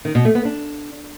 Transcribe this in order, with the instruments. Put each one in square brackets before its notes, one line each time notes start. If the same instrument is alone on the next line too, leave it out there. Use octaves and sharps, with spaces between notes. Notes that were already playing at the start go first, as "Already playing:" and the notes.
[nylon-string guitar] D#3
B2
A3
B3
D4